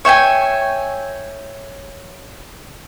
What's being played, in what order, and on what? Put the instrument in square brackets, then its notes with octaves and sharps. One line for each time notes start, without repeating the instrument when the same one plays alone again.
[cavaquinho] C#5 E5 G5 G#5